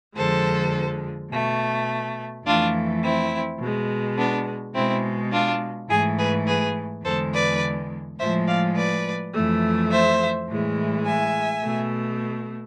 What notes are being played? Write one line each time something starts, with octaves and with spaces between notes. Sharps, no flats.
F2 D3 F3 G#3 A4 C5
B2 A3
F2 E3 A3 D4 F4
C4 E4
B2 G#3
B3 D4
B2 G#3 C4 E4
D4 F4
G#2 E3 A3 E4 G#4
G#4 B4
G#4 B4
E2 D3 G#3 A4 C5
B4 D5
A2 F3 G#3 C5 E5
D5 F5
B4 D5
F2 E3 A3
C5 E5
A2 E3 G#3
E5 G#5
B2 A3